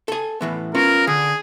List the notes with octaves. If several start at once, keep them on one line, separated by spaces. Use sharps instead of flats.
A4 G#5
A2 E3 B3
B3 C#4 F4 A#4
D3 G#4